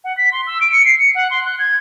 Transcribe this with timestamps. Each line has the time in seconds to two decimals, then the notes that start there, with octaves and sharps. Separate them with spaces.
0.04 F#5
0.17 B6
0.32 C6
0.47 E6
0.61 D7
0.72 C#7
0.85 C7
0.99 C#7
1.15 F#5
1.31 C6
1.45 F#6
1.59 G#6